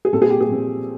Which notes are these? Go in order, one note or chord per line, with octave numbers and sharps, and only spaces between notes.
G#4
A#2 G3 C4 A4
G#4
G4
G#4
A#2 G3 C4